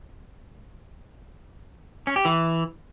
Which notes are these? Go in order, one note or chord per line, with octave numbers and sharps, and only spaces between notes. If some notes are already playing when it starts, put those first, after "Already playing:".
C#4
G4
E3